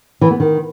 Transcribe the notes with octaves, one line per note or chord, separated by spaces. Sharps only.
E3
B3
D#3